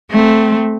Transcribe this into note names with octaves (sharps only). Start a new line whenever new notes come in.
A3 C4